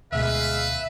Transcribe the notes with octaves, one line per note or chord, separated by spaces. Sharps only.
D2 B2 G#3 B4 E5 F5